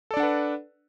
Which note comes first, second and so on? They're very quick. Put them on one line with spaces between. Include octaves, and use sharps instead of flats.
A4 D5 D4 F#5 B4